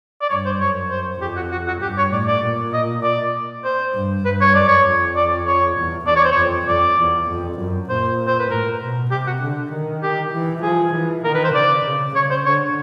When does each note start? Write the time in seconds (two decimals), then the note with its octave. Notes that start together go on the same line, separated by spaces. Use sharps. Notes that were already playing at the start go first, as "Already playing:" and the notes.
0.21 D5
0.29 G2 C#5
0.45 C5
0.60 F#2 C#5
0.91 C5
1.21 F2 G4
1.36 F#4
1.52 F#4
1.67 F#4
1.82 G2 G4
1.98 C#5
2.12 A2 D5
2.27 D5
2.42 A#2
2.73 D#5
3.03 D5
3.64 C5
3.94 G2
4.25 G2 B4
4.41 C#5
4.54 F#2 D5
4.68 C#5
4.86 F2
5.16 D5
5.47 C#5
5.78 E2
6.07 E2 D5
6.16 C#5
6.25 C5
6.32 C#5
6.37 F2
6.68 F2 D5
6.98 E2
7.29 F2
7.60 F#2
7.90 A#2 C5
8.27 C5
8.39 B4
8.50 A2 A#4
8.81 B2
9.11 C3 G4
9.27 F#4
9.42 D3
9.72 D#3
10.03 G4
10.33 E3
10.63 F3 G#4
10.94 E3
11.24 D#3 A#4
11.34 B4
11.44 C5
11.54 C#3 D5
11.84 C#3
12.15 C#3 C#5
12.30 C5
12.46 D3 C#5